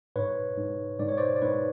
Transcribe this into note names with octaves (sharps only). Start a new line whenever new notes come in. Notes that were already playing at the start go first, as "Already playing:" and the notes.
G#2 B4 C#5
G#2
G#2 D5
C#5
C5 D5
D5
G#2 B4 C#5